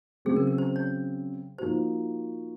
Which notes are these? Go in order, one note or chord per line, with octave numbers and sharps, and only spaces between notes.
C#3 F#3 C4 G#4
A#4
A#4
C5
C#5
F3 A#3 D#4 F#4 C5